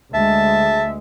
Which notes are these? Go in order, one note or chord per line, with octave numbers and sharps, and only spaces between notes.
D2 G#3 E5 A5